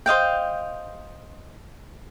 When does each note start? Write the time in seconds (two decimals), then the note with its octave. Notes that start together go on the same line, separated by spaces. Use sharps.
0.06 C5 D#5 F5 G5